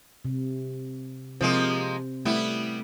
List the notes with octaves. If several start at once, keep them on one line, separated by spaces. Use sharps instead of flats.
C3
C3 F3 G#3 A#3 C5
G3 A3 B3 E4